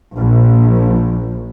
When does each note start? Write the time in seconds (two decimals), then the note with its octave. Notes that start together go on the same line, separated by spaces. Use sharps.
0.16 A#1